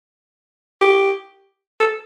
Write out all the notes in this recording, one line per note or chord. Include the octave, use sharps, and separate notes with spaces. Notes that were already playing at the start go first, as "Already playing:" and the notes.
G4
A4